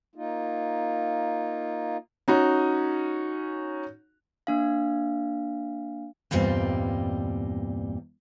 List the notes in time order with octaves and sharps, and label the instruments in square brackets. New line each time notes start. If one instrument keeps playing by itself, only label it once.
[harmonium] A#3 D#4 F4
[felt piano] C#4 D#4 F#4
[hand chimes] A#3 D4 F5
[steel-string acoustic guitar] E2 G2 A#2 G3 C4 D#4